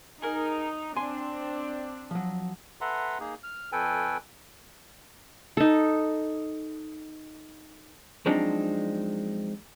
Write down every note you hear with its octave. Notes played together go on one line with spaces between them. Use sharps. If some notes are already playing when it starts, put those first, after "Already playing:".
D#4 G#4 A#4
C4 D4 G#5 C6
F3 F#3
A4 B4 E5 F#5 A#5 C6
A#3 D#4 G#4
F6
F2 A4 B4 G5 G#5
D#4 A4
F3 F#3 G#3 C4 D4 D#4